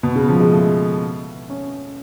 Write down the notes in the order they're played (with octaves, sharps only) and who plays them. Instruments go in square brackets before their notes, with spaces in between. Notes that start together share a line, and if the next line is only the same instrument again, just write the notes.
[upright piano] B2
C#3
F3
G#3
A3
C#4